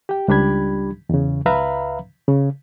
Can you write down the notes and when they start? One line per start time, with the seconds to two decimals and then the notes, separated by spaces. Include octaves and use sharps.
0.09 G4 G5
0.28 C#2 G3 D4 G4 B5 G#6
1.09 E2 C#3
1.46 C#2 B4 E5 F5 A#5 B5
2.28 C#3